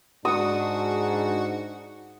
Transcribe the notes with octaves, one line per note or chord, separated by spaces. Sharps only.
G#2 D4 F#4 F#5 D#6